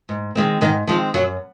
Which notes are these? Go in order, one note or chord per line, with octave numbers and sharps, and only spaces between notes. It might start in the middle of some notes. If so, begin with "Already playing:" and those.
G#2
D#3 G#3 C4
G#2 D#3 D#4
D#3 F3 G#3 C4 F4
F#2 F#3 F#4